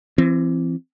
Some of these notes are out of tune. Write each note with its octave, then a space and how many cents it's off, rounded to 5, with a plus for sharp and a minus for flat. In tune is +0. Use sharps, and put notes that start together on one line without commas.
E3 +30 C4 +0